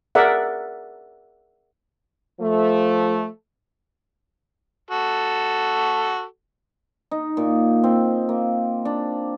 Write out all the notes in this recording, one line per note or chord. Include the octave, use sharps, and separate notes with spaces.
G#4 A#4 D5 E5 F#5
F3 A3
F#4 A4
D#4
A#2
C4
A#3
D4